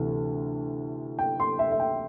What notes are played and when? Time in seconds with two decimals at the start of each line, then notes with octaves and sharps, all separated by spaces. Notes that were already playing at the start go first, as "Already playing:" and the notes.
Already playing: D2 C3 E3
1.19 G5
1.40 C6
1.59 E5
1.72 E5
1.80 G5